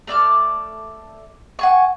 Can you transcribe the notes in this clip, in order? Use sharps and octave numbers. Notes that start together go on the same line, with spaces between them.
A3 D5 D6 F6
F#5 G#5 C#6